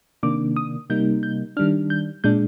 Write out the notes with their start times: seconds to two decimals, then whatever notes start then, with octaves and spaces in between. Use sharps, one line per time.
0.23 C3 D#3 A#3 D4 D6
0.56 D#6
0.90 C3 G3 A#3 D#4 G6
1.23 G6
1.57 D#3 G3 D4 F6
1.90 G6
2.24 A#2 G#3 D4 G6